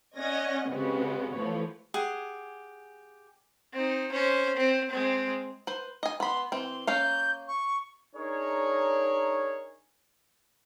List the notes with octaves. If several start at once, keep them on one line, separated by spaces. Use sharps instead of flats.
C#4 D5 D#5 F#5 G#6 A#6
C#3 G#3 B3 C4 F#4 G4
E3 F3 A3 B3 C#5
G4 G#4 F#5
C4 D#4
C#4 C5
C4
G#3 C4
B4 C5
D#5 G#5
B3 B5 C6
E3 C4 C6
A#3 C#4 F5 G6
C#6
D4 D#4 G#4 A#4 C#5